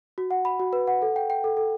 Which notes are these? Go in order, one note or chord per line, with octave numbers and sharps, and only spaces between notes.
F#4
F#5
B5
F#4
B4
F#5
A4
G5
G5
A4
A4